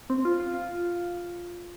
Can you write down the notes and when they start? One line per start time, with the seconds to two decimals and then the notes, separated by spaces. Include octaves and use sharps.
0.10 C4
0.25 F4
0.40 F4
0.54 F4